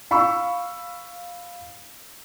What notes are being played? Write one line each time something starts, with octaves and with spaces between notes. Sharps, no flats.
F5 B5 C#6 E6